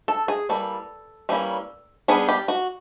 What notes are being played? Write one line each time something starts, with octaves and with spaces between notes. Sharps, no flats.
A4
G#4
E3 G3 A#3 A4
E3 G3 A#3 C#4
G3 B3 D4 G#4
G4
F#4